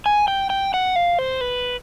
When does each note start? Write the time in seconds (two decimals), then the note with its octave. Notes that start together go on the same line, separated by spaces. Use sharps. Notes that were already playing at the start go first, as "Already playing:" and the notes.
0.06 G#5
0.28 G5
0.50 G5
0.74 F#5
0.96 F5
1.19 C5
1.41 B4